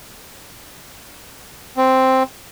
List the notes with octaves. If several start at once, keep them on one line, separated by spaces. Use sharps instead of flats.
C4